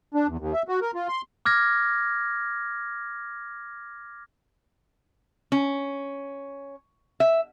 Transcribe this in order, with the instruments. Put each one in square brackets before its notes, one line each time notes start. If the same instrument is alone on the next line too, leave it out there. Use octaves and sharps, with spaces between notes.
[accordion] D4
E2
D#2
E5
F#4
A#4
F4
C6
[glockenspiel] D6 F6 G#6 A#6
[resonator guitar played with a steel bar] C#4
E5